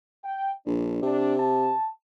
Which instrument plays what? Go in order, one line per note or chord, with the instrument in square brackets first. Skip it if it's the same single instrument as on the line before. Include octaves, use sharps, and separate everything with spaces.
[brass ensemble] G5
[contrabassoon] A#1 [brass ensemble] D4
[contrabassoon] C3 [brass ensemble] D4
[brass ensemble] A5